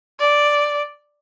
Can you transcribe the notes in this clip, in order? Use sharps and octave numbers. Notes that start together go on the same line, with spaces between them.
D5